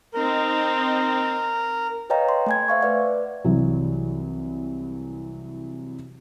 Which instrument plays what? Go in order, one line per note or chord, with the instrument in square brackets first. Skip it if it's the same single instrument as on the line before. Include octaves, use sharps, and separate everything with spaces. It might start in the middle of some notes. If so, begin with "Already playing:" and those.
[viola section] C4 D#4 [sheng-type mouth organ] A#4
[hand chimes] B4 C#5 D#5 F5 G5 A#5
C6
A3 G#5 G#6
C5 E5 F5 C#6
B4 D5 F#5
[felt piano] C2 E3 F#3